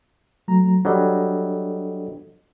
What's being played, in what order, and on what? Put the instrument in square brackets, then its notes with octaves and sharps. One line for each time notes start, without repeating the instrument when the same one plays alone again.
[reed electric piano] F#3 A3 A#5
[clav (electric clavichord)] F#3 G3 [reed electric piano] D4 A4 D#5